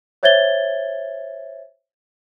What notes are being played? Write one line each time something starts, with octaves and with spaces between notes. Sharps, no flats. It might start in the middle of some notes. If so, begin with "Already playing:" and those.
C5 C#5 E5 G#6 A6 G7